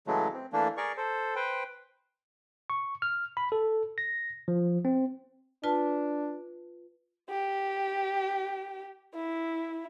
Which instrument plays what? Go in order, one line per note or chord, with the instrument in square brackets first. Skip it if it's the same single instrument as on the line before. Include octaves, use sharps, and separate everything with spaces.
[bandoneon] C#3 E3 F#3 G#3 A3
C4
E3 A3 A#3 D4
G#4 A#4 D5 C#6
A4 C5
B4 C5 G5
[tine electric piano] C#6
F6
B5
A4
A#6
F3
C4
[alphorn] D4 [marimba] F4 B4 A5
[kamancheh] G4
E4